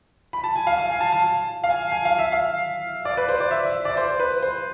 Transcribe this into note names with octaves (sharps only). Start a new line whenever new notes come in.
B5
A5
G#5
F5
F5
G#5
A5
A5
F5
G#5
G#5
F5
E5
F5
D5
B4
C5
D5
E5
E5
D5
C5
B4
C5